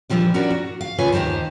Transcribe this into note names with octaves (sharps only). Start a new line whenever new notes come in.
A#2 E3 F3 G3 D4
C#4 D4 F#4 A#4 C#5 D5
F#4
F5
D2 C#3 F4 B4 C#5 G#5
D#2 D#3 G4 C5 A5